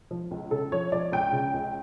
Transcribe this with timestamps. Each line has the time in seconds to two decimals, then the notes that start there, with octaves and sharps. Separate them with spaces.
0.11 F3
0.31 C#2
0.51 C#3 A4
0.72 F3 C#5
0.92 F3 D5
1.12 C#2 G5
1.32 C#3
1.54 C#2